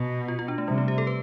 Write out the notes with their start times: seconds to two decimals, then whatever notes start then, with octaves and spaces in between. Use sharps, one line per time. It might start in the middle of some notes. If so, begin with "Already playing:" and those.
Already playing: B2
0.28 F4
0.39 F4
0.48 D4
0.58 A3
0.68 C3 G3
0.78 A3
0.88 G4
0.98 A4
1.07 B4